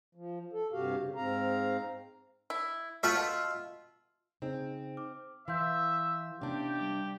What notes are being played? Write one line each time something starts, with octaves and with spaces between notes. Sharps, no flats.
F3
A4
G2 C3 F#4 G4 F5
C#3
G#2 C4 F5 A#5
E4
A3 F4 E5 B5
B2
C#3 C4 D#4 G#4
D6 F6
E3 E5 F5 C6 G6
C3 B3 C#4 D4 G4
G3 D6